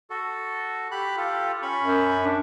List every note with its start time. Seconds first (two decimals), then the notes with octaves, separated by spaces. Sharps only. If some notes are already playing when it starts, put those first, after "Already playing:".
0.10 F#4 A4
0.91 G4 B5 F#6
1.17 F4 G4 A4
1.62 C#4 B5 C#6
1.83 F#2
2.23 D4